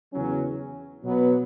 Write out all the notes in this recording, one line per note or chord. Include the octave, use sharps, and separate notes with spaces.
E2 C#3 F#3 C#4
B2 F#3 B3